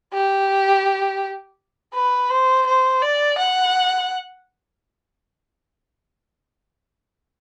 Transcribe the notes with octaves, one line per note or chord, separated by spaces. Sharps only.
G4
B4
C5
C5
D5
F#5